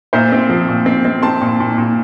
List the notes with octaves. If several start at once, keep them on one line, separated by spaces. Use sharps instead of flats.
A#2 C5 E5
C4
F3
A#2
C4
C4
C4 A5 C6
A#2
A#2
A#2